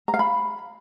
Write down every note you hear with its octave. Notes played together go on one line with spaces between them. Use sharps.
A#5
F5
B5